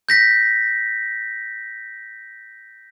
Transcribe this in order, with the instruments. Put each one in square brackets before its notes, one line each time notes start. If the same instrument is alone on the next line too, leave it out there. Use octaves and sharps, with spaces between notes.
[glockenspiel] G6 A#6 B6